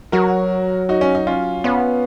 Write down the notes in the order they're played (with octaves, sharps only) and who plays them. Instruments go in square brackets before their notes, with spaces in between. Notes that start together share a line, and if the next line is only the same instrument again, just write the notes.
[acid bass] F#3 [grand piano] F#4 A#4
[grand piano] D#4 F#4
C#4
D#4
C#4 F4
[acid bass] B3 [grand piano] C#4 F4